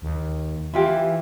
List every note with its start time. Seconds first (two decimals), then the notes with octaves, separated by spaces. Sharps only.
0.02 D#2
0.74 E3 E4 F4 G4